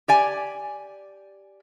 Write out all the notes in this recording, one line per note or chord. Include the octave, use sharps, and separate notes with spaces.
G4 D5 G#5